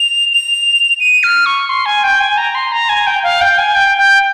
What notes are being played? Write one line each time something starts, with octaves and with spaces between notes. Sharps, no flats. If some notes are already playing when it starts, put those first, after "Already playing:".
Already playing: F7
F7
D#7
F6
C#6
C6
G#5
G5
G#5
A#5
C6
A#5
G#5
G5
F5
G5
G#5
G5
G5